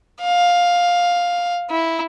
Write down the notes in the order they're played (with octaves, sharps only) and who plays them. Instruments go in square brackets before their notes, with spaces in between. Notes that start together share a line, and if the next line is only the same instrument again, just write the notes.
[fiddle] F5
E4